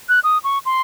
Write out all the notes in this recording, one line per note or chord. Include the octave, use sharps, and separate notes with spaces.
F#6
D#6
C#6
C6